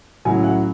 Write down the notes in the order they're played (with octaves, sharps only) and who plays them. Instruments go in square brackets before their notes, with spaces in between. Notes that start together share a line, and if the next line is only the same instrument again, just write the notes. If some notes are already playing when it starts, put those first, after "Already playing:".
[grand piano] A2 F#3 C#4 E4 G#5
F#5